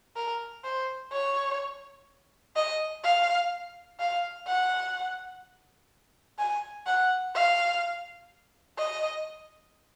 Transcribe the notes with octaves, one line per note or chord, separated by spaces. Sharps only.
A#4
C5
C#5
D#5
F5
F5
F#5
G#5
F#5
F5
D#5